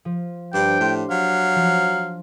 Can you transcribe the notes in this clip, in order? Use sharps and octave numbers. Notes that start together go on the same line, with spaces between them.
F3
G2 D4 G4 C5 G5
A2 C6 C7
F#3 F5
F3